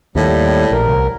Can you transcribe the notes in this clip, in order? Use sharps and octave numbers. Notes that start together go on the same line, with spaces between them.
D#2 A2 G3
A#1 A#4
C2